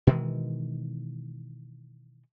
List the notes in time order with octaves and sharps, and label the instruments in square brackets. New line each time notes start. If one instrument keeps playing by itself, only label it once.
[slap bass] B2 D#3 E3 G#3